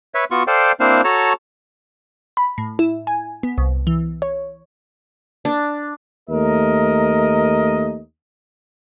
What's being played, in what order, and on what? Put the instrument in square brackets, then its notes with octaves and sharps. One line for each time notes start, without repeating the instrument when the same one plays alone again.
[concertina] B4 C#5 E5
B3 F4 F#4 C#6
A4 C5 D5 F5 G5
A#3 C4 D4 E4 C5 F5
F#4 A4 C#5 A5 A#5
[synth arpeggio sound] B5
A2
E4
G#5
B3
C2
E3
C#5
[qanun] D4
[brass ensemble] D#2 A3 A#4 D#5